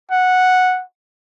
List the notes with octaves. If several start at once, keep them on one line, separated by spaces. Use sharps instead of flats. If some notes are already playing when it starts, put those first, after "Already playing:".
F#5